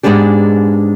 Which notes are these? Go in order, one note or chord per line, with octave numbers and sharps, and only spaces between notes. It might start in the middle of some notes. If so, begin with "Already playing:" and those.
G#2 F3 G#3 B3 D4 G4